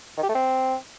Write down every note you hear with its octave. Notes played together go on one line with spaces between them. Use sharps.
D#3
G4
A3
C4